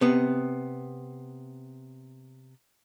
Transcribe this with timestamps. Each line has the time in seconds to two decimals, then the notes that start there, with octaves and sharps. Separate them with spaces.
0.01 C3 B3